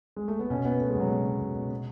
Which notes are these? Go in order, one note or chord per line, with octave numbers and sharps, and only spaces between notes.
G#3
A3
B3
B2 C#4
B2 B3
B2 A3
G#3
B2 F#3
B2
B2
B2
B2
B2